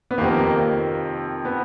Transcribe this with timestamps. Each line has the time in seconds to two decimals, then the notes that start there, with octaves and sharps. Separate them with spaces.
0.11 B3
0.18 F2 C3 D#3 A#3
1.45 B3